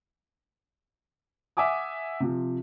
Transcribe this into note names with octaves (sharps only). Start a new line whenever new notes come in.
E5 F#5 G#5 D6 D#6
C3 F3